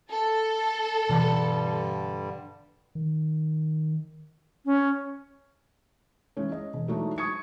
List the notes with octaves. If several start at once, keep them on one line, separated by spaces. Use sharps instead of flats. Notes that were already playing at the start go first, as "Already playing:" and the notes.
A4
G2 B2 D3 E3 G3
D#3
C#4
E3 G#3 C#4
D#5
E1
E3 F#3 G#3 A3 D4 D#4
C#6 D#6 G#6 C#7